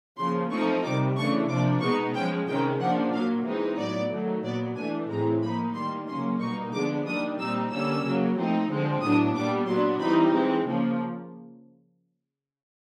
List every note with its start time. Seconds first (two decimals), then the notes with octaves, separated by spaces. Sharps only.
0.18 C#3 F3 A#3 C6
0.51 F3 A3 C4 D#4 C#6
0.84 C3 D#3 G3 D6
1.16 C#3 E3 A3 D4 C#6
1.49 C3 F3 A#3 D4 D6
1.81 B2 G#3 B3 D#4 C#6
2.14 F3 G#3 C#4 G5
2.47 C3 D#3 G#3 C#4 G5
2.80 C#3 F3 A#3 D4 F#5
3.13 A#2 F#3 A#3 F5
3.45 E3 G#3 C4 D#4
3.78 A2 F#3 B3 D5
4.11 D#3 F#3 A3
4.43 A#2 F#3 B3 D5
4.76 E3 A3 D4 G#5
5.09 A2 E3 G#3 C4 A#5
5.41 F3 A#3 D#4 B5
5.74 D#3 G3 A#3 C6
6.07 C#3 F#3 A#3 C#4 C6
6.40 B2 G3 A#3 D#4 C#6
6.72 D3 F3 G#3 B3 D4 D6
7.05 D#3 G3 A#3 D4 D#6
7.39 A#2 G3 C4 D#4 E6
7.71 D3 G3 A#3 C#4 E6
8.03 C#3 F#3 A#3
8.37 F3 A3 C4 D#4
8.69 D3 F3 G#3 C4
9.02 A2 F#3 B3 D4 D#6
9.34 A#2 G3 B3 D6
9.67 A#2 F#3 B3 D4 C6
10.00 E3 G3 C4 D#4 B5
10.33 E3 G#3 C4
10.66 C#3 F3 A#3